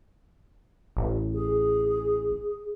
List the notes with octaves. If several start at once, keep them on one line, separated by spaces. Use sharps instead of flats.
A1
G#4